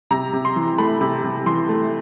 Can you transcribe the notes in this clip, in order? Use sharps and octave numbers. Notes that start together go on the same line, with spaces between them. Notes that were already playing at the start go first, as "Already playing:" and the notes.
C3 A#5
C3
C6
E3
A3 B5
C3
C3
E3 C6
A3